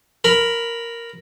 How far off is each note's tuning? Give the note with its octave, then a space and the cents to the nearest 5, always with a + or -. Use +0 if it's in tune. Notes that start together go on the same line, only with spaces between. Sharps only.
A#4 +0 B5 +0